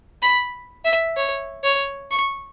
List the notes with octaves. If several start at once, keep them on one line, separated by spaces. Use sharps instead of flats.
B5
E5
C#5
C#5
C#6